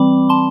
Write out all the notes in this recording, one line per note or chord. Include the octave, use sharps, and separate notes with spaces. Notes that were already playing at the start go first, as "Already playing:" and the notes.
Already playing: E3 G3 C4 B5 D6
A5 C6